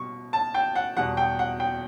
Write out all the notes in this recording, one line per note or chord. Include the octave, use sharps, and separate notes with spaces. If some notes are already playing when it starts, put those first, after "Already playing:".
Already playing: B2 G3 C#6
A5
G5
F#5
E2 B2 G3 F#5
G5
F#5
G5